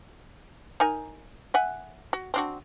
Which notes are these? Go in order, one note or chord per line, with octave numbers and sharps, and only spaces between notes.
D#4 A#4 G#5
E5 F#5 G#5
F#4
C4 D4 F#4